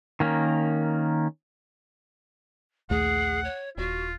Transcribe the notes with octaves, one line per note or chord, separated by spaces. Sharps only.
D#3 A#3 C#4
A#1 D#2 A3 G#4 F#5
C#5
D#1 F4 F#4